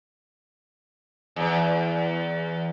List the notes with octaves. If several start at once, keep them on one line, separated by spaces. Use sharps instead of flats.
E2